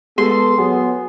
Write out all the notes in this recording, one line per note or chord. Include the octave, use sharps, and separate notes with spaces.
G#3 B3 A4 C6
F#3 B3 G#4